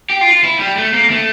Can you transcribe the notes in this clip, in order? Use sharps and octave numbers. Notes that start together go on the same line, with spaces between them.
G4
F4
F4
E4
G3
A3
A#3
A3